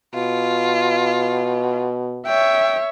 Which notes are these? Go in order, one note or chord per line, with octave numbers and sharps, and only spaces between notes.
B2 F4
C#5 E5 G5